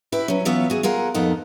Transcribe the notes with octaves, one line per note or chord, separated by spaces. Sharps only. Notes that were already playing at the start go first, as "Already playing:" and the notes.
E4 G4 B4
F#3 C#4
E3 F#3 B3 F4 C#5 E5
F#4 G#4
F4 G#4 A#4 F#5
F2 A#3 B3 D#4 A4 F#5